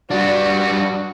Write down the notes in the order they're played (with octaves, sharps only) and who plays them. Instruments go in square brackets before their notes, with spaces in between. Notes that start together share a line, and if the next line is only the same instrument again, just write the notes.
[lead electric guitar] G3 D4 [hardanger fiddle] F#4